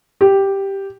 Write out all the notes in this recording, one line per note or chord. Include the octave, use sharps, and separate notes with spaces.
G4